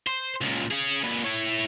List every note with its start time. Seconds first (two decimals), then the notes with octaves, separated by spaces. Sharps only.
0.07 C5
0.41 C#2 A#2
0.71 C#4 G#4
1.03 A#2 B4
1.24 E4 C#5